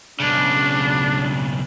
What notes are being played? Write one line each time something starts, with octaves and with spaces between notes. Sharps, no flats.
B1 C#3 D4